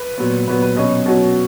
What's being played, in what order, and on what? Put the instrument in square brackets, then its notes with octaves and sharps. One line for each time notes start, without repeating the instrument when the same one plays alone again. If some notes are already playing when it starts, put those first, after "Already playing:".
Already playing: [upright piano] B4
A#2 F#3 B3
A#2 F#3 B3 B4
B4
B2 F#3 C#4 D#5
B2 F#3 C#4